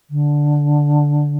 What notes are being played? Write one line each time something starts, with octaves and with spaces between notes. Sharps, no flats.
D3